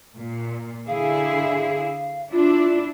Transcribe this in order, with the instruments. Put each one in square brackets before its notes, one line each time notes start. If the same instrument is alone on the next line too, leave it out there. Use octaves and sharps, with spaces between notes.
[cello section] A#2
[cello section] D3 E4 G#4 [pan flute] F5
[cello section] D4 E4 [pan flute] F4